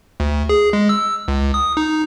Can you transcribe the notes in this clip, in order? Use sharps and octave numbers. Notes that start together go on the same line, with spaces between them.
D2
G#4
G#3
E6
C#2
D#6
D#4